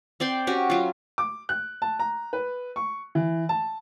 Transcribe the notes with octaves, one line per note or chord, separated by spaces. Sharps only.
C4 D5 G5 C6
C#4 F#4 G4
F#3 F4
D6
F#6
A5
A#5
B4
C#6
E3
A5